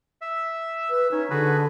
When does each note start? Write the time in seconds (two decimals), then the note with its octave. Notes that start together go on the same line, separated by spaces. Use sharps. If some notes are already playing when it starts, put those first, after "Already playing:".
0.21 E5
0.90 B4
1.11 C#4 D#4
1.30 D3 F#4 G#4 B4